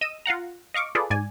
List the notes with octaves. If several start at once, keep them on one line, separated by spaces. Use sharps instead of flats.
D#5 E6 D#7
F4 F5 F#5 A#5
D#5 F5 C#6 D6
F4 G#4 A4 B4 D5
G#2 D5 G#5